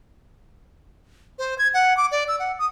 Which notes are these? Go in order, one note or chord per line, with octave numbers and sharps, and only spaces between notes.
C5
G#6
F#5
D6
D5
E6
F#5
D#6